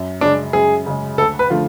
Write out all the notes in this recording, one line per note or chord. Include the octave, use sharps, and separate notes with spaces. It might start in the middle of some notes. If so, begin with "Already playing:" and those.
Already playing: F#2
C#3 G#3 D4
F#2 G#4
C#3 G#3
D2 A4
B4
D3 F3 A3 F4